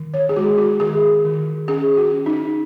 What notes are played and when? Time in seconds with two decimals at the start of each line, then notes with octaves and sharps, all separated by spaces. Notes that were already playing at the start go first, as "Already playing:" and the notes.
Already playing: D#3
0.14 C#5
0.29 G#4
0.36 G#3 F#4
0.58 F#4
0.80 D#3 G#4
1.25 D#3
1.68 C#4 G#4
1.97 F#4
2.12 C#4
2.26 D#4